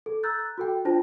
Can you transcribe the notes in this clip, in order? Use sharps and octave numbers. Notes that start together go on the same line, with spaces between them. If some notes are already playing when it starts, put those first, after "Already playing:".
A4
A#5 E6 F#6 G6 A6
F#4 A4 G5
D4 F4 C5 G5 A5 A#6